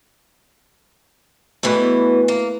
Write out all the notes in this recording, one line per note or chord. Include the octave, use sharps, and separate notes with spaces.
E2 B2 E3 A3 B4
A#3